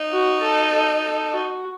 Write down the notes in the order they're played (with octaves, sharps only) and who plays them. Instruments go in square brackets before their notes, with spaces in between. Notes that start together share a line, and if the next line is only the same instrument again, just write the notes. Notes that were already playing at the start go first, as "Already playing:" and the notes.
Already playing: [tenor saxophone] D#4
[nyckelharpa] F#4
A4
A4
A4
F#4